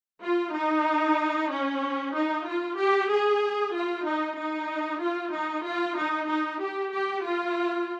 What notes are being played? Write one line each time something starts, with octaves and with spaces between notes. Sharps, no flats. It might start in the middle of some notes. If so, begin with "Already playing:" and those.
F4
D#4
C#4
D#4
F4
G4
G#4
F4
D#4
D#4
F4
D#4
F4
D#4
D#4
G4
G4
F4